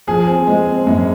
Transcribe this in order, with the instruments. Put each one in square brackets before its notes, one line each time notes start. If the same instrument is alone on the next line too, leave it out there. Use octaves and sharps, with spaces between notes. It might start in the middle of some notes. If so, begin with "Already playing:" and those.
[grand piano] F3 [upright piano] G#4
[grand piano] C4
G#3
C4
F#2